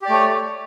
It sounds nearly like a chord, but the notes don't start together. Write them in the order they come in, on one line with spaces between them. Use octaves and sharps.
G4 D5 A3 C#5